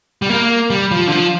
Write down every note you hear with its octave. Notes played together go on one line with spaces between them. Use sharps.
G3
A#3
G3
F3
D3
F3